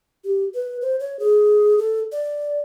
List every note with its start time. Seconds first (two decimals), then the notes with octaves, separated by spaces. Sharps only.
0.24 G4
0.54 B4
0.81 C5
1.00 C#5
1.19 G#4
1.78 A4
2.12 D5